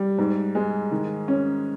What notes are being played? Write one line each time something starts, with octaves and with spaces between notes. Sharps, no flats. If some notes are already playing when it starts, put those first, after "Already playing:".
Already playing: G3
G#2
G#3
D#3
C#4